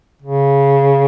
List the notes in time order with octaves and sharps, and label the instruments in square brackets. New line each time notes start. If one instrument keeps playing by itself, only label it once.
[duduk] C#3